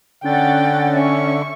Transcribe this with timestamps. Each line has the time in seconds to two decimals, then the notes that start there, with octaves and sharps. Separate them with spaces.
0.24 D3 C#4 F#5 G5 A6
0.96 C#4 E5 C#6